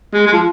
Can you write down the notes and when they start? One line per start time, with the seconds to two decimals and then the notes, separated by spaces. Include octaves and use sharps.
0.13 G#3
0.26 G#3
0.33 F3